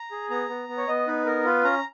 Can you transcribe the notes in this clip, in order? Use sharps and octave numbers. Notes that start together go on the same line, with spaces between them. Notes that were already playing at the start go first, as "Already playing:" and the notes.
Already playing: A#5
G#4
B3 A#5
B3
B3
C#5
B3 D#5
D#4 B4
B3 A#4
F4 B4
C#4 A#5